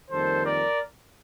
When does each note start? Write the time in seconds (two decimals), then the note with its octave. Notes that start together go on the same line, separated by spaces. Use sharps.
0.10 F2 D#3 G3 A#3 A4 C5
0.43 A#4 D5